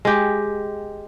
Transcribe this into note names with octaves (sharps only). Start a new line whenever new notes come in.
G#3 G4